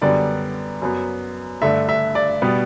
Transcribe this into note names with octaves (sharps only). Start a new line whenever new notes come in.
F#2 D3 G3 B3 D5
F#2 F#3 B3
G2 D3 A3 E5
E5
D5
B2 G3 B3